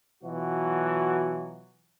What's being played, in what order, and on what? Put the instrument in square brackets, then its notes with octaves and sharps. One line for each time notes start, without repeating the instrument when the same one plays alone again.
[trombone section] B2 E3 F#3 F4 F#4